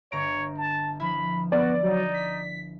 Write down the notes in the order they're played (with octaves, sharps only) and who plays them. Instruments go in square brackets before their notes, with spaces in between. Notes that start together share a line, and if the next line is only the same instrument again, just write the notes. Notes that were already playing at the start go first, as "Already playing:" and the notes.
[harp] G1 A#5 D7 [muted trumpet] C#5
[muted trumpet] A5
[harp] F3 E4 [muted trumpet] B5
[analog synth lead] B3 [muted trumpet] F#4 [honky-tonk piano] D5
[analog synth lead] F#3 [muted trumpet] D#4
[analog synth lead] B6